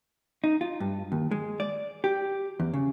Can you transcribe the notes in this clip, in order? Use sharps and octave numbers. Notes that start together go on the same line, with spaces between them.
D#4
F4
G2
D#2
G#3
D5
G4
E2
C#3